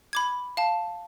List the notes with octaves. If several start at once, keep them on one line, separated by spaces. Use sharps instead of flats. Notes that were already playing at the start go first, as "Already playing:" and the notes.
B5 D6 G#6
F5 A5